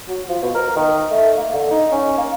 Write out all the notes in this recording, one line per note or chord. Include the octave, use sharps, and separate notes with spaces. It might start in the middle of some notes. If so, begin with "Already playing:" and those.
F#3
F3
B2
A#4
D#3
A3
A#3
D3
D#4
C#4
A#3